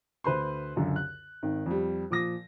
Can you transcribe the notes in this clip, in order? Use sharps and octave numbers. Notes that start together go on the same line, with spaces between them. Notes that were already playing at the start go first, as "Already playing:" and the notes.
D2 B4 C5 C6
C#2 F#2 D3
F#6
G#1 D#3
F2 G3
A#2 F3 D6 D#6 A#6